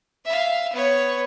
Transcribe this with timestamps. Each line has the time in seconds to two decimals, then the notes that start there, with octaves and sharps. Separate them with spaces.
0.25 E5 F5
0.73 B3 C#5